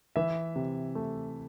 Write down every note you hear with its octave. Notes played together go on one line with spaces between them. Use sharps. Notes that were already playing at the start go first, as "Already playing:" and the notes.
E3 E5
C3
A3